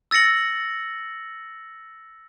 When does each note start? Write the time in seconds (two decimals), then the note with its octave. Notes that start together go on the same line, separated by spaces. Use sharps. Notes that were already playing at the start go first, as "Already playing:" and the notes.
0.11 E6 A6 A#6 C#7 F#7